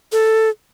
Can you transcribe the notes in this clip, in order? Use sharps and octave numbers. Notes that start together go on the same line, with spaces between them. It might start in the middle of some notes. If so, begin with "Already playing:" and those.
A4